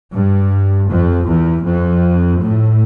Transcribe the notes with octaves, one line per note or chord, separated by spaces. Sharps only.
G2
F2
E2
F2
A2